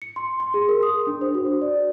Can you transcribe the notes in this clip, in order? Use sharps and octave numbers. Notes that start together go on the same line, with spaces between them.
C#7
C6
C6
G#4
A#4
D#6
D4
C5
F#4
D5